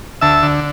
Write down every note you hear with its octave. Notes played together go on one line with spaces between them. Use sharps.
D2 E5 A5
D3